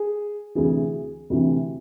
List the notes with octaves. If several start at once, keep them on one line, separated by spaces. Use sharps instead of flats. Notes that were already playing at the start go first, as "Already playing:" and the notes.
Already playing: G#4
D2 C3 E3 G#4
D2 C3 E3